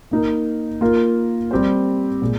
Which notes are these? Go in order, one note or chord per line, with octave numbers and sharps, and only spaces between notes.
A#3 D#4 A#4
A#3 F4 A#4
G3 C4 G4 C5
A#2 G#3